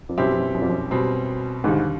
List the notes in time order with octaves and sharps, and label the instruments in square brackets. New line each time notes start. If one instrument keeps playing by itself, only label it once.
[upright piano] F2
[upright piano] F#2 [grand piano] B2 G3 C4 E4 G4
[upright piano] F#2
F#2
F2
F#2
[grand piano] B2 G3 C4
[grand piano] D#2 D3 G3 [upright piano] G#2